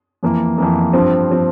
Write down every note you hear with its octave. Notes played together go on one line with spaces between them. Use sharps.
F2 E3 A#3
F2 E3 A#3
G2 F3 C4
F3 C4